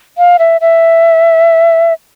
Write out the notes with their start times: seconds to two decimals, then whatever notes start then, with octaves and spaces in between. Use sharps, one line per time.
0.18 F5
0.39 E5
0.61 E5